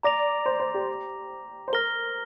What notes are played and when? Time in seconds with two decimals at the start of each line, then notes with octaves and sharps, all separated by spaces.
0.03 D5 A#5 D6 A#6 F7
0.46 C5
0.60 C5
0.74 G4
1.68 C5
1.73 A#4 F6 A#6 G7